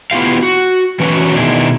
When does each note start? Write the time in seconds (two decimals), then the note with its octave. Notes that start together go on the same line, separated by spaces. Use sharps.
0.11 B3 E4 F4 G4 F5
0.43 F#4
1.00 E3 F#3 C#4 F#4 B4 C#5
1.34 B2 D#3 D4 E4 G#4